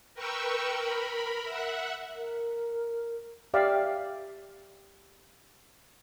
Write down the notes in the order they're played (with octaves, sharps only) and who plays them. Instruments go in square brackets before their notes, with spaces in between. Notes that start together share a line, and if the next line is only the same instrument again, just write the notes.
[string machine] A#4 B4 G5 C#6 E6
A#4 B5
E5 F#5
[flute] A#4
[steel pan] G4 D5 E5 F5